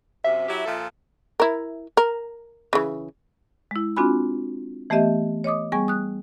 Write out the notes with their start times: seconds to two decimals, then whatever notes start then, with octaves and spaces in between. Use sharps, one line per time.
0.24 F#2 C3 E5
0.48 F#3 E4 G4
0.65 A#2 F3 A4
1.40 E4 A#4
1.97 A#4
2.73 C#3 E3
3.71 G#3 E4
3.96 C4 D4 F4 F#4 G#5 B5
4.90 E3 A3 B3 G4 D#5 E5
5.44 C#5 D#5 D6 D#6
5.72 G3 B3 G#4 G#5 C#6
5.88 D#6 F#6